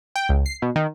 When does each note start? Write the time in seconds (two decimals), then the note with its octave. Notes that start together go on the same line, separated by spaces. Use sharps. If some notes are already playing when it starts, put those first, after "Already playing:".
0.16 G5
0.29 C#2
0.46 C7
0.62 B2
0.76 D#3